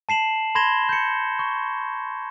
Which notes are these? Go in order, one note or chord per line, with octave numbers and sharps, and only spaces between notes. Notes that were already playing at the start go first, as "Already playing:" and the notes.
A5 C7 E7 F#7
B5 C6 G#6 A#6 E7 G7
G6 C#7
C#6